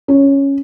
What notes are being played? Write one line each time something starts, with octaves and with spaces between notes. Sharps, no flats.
C#4